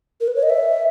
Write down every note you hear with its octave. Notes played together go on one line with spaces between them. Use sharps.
A#4
B4
C#5
D#5
E5